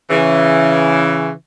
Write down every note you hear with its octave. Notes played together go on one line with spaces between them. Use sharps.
C#3 E3